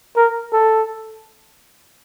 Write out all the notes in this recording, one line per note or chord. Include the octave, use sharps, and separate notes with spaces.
A#4
A4